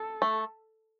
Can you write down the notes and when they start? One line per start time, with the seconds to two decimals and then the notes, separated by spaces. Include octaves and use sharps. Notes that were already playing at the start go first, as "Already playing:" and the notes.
Already playing: A4
0.22 A3